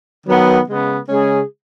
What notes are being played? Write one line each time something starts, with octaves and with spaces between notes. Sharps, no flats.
D#3 F#3 B3
C#3 G#3 B3
C#3 G#3 C#4 G#4